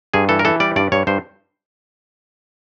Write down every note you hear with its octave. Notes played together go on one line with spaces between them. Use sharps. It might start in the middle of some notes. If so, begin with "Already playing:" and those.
G2 G#4
E3 A4
A#4
E3 A4
G3 D5
G2 D5
G2 C#5
G2 C5